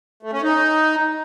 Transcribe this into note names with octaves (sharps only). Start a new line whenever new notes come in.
A3
C#4
D#4